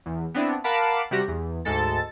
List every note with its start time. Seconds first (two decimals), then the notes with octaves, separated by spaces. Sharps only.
0.06 E2
0.34 B3 C4 D4 E4
0.64 A#4 F5 F#5 A5 B5 D6
1.11 C3 G3 F#4 G4 A#6
1.28 E2
1.65 D2 G#2 G#3 A4 A5 A6